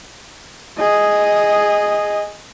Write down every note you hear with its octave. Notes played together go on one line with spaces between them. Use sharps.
G#4 D#5